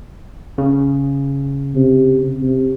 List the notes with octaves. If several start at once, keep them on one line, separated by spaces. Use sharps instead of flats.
C#3
C3
C3